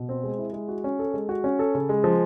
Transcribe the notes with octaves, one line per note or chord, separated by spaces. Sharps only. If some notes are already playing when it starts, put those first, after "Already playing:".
Already playing: B2
C4
G#3
E4
G#3
F#4
C#4
A4
G#3
F#4
C#4
A4
C#3
G#3
F3